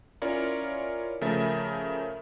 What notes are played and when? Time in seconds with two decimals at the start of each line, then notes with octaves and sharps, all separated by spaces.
0.22 C#4 E4 F4 A#4 C#5 D5
1.21 C#3 F3 A3 A#4 E5 A6